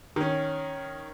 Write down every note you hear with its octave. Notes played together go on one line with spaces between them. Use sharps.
D#3 C#4